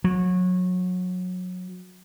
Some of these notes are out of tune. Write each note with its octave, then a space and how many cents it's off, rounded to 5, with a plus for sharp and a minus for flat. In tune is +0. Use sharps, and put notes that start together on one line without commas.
F#3 -25